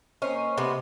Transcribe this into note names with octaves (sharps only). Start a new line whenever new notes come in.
A#3 C#4 C5 D#5
C3 B3